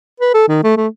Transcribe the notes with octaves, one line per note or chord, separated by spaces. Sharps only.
B4
A4
D#3
A3
A3